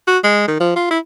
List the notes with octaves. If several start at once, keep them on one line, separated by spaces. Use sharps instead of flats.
F#4
G#3
D#3
F3
F4
E4